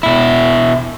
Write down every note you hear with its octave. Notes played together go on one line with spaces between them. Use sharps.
B2 E4